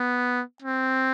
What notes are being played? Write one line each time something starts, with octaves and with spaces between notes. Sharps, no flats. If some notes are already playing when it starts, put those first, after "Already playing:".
Already playing: B3
C4